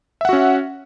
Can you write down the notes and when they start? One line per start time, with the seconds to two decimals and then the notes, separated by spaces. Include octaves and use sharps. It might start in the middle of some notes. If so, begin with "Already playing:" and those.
0.21 E5
0.25 F#5
0.29 F#4
0.33 C#4